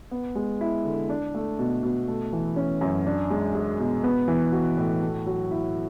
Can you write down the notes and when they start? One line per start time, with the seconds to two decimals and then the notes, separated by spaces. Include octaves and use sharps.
0.11 B3
0.35 G#3
0.61 E4
0.84 D3
1.09 D4
1.34 A3
1.59 B2
1.83 B2
2.08 A3
2.33 E3
2.56 C#4
2.81 F#2
3.06 D4
3.30 G#3
3.55 G#4
3.80 B2
4.04 B3
4.28 E3
4.52 F#4
4.77 A2
5.02 A3
5.26 F#3
5.51 E4